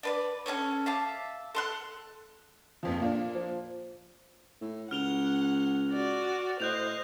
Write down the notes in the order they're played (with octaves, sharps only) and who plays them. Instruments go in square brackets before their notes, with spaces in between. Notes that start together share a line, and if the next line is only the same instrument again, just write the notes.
[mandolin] D4 B4 D5
C#4 F4 A4 C#5
E5 F5 A5 D6
A4 C6 F#6
[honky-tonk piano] A#1 F2 F3
A#2 A#3 D4
[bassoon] F3
[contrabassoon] A2
[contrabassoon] C#2 [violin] F#5 [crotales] F6 F7 G7
[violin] F#4 D5
[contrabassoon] A2 [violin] C5 D#5 [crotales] F#6 G6 F7